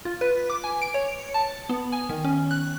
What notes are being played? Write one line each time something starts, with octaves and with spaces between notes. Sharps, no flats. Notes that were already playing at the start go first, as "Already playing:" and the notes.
F4
B4
D6
G#5
D7
C#5
A5
B3
G#5
D#3
C#4
F#6